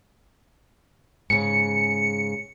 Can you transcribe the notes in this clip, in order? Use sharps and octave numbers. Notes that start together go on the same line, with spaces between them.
G#2 C#3 C#7